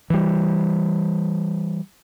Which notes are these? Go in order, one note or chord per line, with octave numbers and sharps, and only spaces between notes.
E3 G3